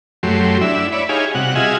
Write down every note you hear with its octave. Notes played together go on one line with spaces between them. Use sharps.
F#2 F#3 A3 G4 C6
D4 E4 E5
C#5 D5 E5 B5
D#4 G4 G#4 C#5 F5 G#5
C3 G3 F#4 F#5
F4 F#4 G#4 D#5 E5 G#5